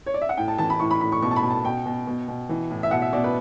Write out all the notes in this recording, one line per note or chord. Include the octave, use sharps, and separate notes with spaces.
C#5
D5
E5
F#5
A2 G5
A5
E3 A5
B5
A2 C#6
B5
A2 B5
C#6
B2 C#6
A5
B5
B2
A5
B2 G5
B2
B2
B2
E3
A2
E5
B2 F#5
E5
B2 D5
B4